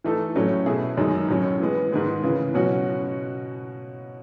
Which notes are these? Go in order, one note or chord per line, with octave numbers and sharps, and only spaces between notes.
E3 A3 D#4 A4
A2 F#3 A3 C#4
B2 A3 E4 G#4
F#2 D#3 G#3 D#4
A2 F#3 C#4
E3 G#3 B3
G#2 D#3 G#3 B3
C#3 E3 B3
B2 F#3 C#4 F#4